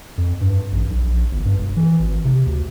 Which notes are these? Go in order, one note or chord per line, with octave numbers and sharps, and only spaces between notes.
F2
G2
A1
B1
A#1
G1
G2
E1
E3
G#1
C3
D2